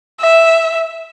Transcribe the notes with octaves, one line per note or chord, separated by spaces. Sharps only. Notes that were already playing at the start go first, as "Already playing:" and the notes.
E5